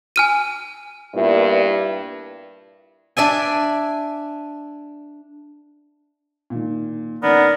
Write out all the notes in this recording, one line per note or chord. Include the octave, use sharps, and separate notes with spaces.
G#5 F6 D#7
G2 A#2 B3 E4
D4 D5 E5 G#5
A#2 D#3
D#3 B3 C#4 A#4 D5